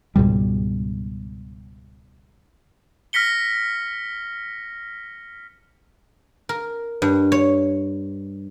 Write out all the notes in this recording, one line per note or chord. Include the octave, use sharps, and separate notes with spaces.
C#2 G#2 B2 G3
F6 A#6 B6 C#7 G7
A#4
G2
C#5